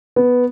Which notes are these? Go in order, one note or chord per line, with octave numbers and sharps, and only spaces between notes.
B3